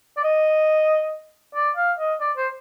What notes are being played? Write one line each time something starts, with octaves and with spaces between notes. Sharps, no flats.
D5
D#5
D5
F5
D#5
D5
C5